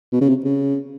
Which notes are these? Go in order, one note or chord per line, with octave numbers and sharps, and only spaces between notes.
B2
C#3
C3
C#3